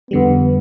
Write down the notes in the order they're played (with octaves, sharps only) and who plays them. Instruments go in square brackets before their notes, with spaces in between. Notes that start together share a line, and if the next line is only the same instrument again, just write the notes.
[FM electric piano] F2 D3 G3 [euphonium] B3